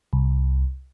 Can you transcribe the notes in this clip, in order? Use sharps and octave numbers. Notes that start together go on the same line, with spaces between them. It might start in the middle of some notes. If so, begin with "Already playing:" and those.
C2